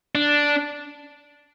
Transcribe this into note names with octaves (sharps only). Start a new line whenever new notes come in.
D4